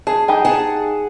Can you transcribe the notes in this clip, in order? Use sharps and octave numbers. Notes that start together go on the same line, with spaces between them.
G#4 A5
D#4 G4 G#5
G#4 F#5 A5